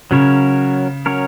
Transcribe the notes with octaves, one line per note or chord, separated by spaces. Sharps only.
C#3 F#3 C#4 A#4 C#5
F#3 C#4 A#4 C#5